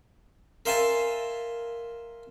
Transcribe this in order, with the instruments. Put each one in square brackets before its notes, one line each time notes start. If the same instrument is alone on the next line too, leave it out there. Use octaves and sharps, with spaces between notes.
[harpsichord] A#4 C5 E5 F5 G#5 A5